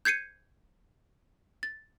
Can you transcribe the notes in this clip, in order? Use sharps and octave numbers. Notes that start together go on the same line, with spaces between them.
G6 G#6 C7 C#7 D#7
A6